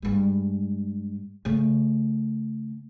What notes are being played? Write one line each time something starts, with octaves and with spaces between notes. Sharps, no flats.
G2 G#3
C#3 A3